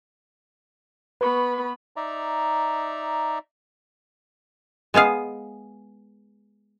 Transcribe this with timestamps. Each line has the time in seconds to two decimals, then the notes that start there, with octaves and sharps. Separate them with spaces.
1.21 B3 B4 B5 C#6
1.96 D#4 D5 E5 A#5
4.94 G#3 B3 G#4 F5